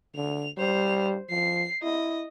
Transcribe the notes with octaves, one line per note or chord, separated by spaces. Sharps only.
D3 F7
G3 C5 F7
F3 C7
E4 D#5